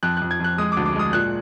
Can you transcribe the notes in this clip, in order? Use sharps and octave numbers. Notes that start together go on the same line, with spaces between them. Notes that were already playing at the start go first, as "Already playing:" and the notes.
F2 F#6
F#6
F2
G#6
F2 F#6
G#3 D#6
D6
D2
D6
G#3 D#6
A#2 F#6